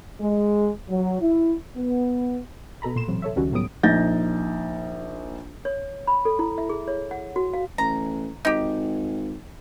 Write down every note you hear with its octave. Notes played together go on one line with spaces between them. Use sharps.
G#3
F#3
E4
B3
B2 A4 A#5 B5
A#2 C6 E7
A1 C3 F#3
A4 C#5 E5
C#2 D#3 G3 C#4 F#4
A2 F#3 G3 B3 D#6 D7
A#1 D#4 G6 A6 A#6
C#5
B5
A4
E4
E5
G#4
C#5
F#5
F#4
F5
A1 A#5
G#1 D#4 G4